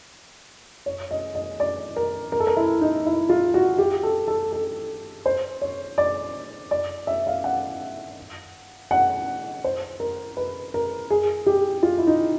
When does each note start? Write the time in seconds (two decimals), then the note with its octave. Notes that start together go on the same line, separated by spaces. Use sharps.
0.86 C#5
1.11 D#5
1.35 D#5
1.60 D5
1.96 A#4
2.32 A#4
2.40 A4
2.47 A#4
2.57 E4
2.81 D#4
3.06 E4
3.29 F4
3.54 F#4
3.78 G4
4.03 A4
4.28 A4
4.52 A4
5.26 C5
5.61 C#5
5.98 D5
6.71 D5
7.07 E5
7.27 F5
7.44 F#5
8.91 F#5
9.64 C5
10.00 A#4
10.37 B4
10.74 A#4
11.10 G#4
11.46 G4
11.83 F4
11.98 E4
12.07 D#4